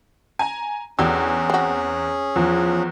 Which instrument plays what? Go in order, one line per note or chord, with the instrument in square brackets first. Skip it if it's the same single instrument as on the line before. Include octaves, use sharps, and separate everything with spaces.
[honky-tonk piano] G#5 A#5
[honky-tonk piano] E2 E6 [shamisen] D3 F#3 G4 [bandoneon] C#4 G#4
[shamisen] C4 F#4
[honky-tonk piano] E2 [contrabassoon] F3